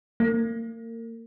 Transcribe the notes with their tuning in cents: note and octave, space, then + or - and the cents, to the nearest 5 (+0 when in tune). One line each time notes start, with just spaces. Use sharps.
A#3 -30